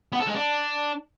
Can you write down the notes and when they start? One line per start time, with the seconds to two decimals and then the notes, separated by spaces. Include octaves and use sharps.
0.12 B3
0.20 A4
0.27 G#3
0.34 D4